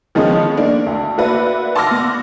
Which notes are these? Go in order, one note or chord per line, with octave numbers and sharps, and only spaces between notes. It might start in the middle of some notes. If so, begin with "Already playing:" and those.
D#3 F3 G#3 B3 C#4
A#3 D4
D2
A#3 F#4 B4 D5 E5
A5 C6 D6 E6 F6 A#6
B3